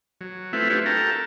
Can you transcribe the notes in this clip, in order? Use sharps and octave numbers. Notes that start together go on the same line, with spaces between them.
F#3
A3 C4 E4 F4 B4 E5
D4 F4 G4 B4 C#5
F#4 A4 A#4 G5 A5 A#5